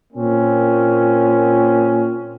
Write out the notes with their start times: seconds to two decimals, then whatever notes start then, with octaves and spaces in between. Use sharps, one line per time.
0.13 A#2 A#3 C4 C#4